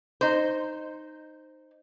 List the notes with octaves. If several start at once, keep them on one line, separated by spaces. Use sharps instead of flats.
D#4 C5